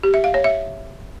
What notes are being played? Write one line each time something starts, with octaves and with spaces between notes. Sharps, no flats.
G4
E5
F5
C#5
E5